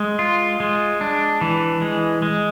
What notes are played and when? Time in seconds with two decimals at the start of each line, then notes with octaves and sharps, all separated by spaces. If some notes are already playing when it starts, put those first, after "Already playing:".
Already playing: G#3
0.19 F4
0.60 G#3
1.01 D4
1.41 E3
1.82 G#3
2.22 G#3